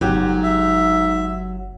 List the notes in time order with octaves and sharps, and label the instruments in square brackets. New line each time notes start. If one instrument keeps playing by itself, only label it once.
[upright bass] G1 C#3 [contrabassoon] G#2 [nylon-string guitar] F#3 G4
[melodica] E5